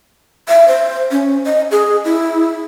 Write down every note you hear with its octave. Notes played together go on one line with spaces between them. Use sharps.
E5
C5
C#4
D#5
G#4
E4